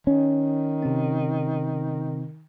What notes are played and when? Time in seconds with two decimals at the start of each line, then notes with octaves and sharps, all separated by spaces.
0.07 D#3 C#4
0.82 C3 C4